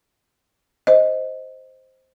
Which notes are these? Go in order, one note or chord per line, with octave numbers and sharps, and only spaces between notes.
C5 D#5